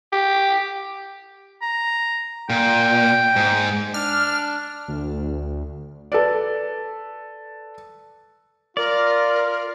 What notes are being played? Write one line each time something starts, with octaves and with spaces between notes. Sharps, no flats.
G4
A#5
A#2 G5
G#2
D4 F6
D2
A4 B4 D5
F4 A#4 D5